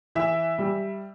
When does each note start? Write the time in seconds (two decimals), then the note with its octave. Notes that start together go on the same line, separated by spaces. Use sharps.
0.15 E3 E5
0.58 G3